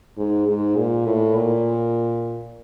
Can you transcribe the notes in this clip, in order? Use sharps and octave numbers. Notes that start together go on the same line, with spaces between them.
G#2
G#2
A#2
A2
A#2